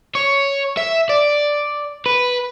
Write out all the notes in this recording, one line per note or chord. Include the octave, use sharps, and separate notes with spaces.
C#5
E5
D5
B4